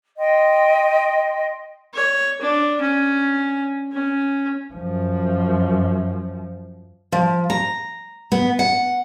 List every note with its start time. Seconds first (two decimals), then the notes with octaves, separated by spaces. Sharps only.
0.18 D#5 G5 C6
1.94 C#5
2.41 D4
2.81 C#4
3.92 C#4
4.74 F#2 F3
7.12 F3
7.50 A#5
8.32 B3
8.59 F#5